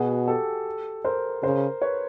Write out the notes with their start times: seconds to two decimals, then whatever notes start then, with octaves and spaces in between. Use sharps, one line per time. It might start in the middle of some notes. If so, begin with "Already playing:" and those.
Already playing: B2 F#4 G#4
0.28 G4 A4
1.04 A#4 C5
1.43 C#3 A#4 C5
1.82 B4 C#5